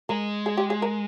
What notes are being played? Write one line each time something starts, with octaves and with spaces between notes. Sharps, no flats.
G#3 A#4
G#4
G4
G#4
A#4